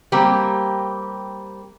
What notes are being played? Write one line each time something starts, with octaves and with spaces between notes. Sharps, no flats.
G3 A#3 C4 G4